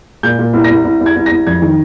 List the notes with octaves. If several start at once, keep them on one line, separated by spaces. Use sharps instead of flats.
A#2 G6
A#2
C2
C2 A#6
C2
C2
G#6
C2
A#6
C2
F2 G#6
D#3